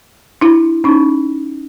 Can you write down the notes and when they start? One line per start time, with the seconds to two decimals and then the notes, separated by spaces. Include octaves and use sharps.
0.41 D4 E4
0.84 C#4 D#4